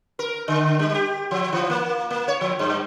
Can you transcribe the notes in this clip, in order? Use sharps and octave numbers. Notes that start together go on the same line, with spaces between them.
A#4
D3
G3
G4
F3
E3
A#3
A#3
C#5
F3
G2